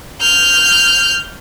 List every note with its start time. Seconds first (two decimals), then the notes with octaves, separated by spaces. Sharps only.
0.21 F6 G6